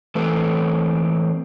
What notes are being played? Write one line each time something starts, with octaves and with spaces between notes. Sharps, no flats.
E3 A3 C4 A4 B4